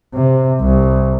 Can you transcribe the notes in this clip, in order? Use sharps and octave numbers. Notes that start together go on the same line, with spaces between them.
C3
C2